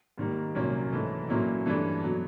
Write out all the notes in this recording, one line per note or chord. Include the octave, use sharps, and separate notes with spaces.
G#2 D#3 G3 A#3
C2 A#2 F#3 A#3 C#4
G#2 E3 A3
A#2 F#3 A#3 C#4 E4
G2 E3 A3 D4
B2 F#3